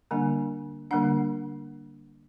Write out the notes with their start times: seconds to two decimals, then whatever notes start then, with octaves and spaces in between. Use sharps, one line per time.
0.11 D3 G3 A#3 D4 G#5
0.91 D3 G3 A#3 D4 F#5